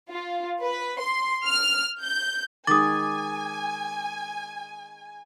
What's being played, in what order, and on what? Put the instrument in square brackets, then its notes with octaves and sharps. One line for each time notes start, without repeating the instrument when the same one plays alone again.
[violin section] F4
B4
C6
F6
G6
[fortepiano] D#3 G#3 [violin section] G#5 [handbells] D6 [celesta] D#6 A6